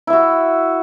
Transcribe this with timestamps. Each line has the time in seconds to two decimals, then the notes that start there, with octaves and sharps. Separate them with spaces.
0.07 E4
0.10 E5
0.13 F#4